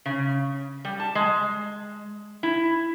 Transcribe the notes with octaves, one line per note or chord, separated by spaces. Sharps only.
C#3
G3
A5
G#3
E4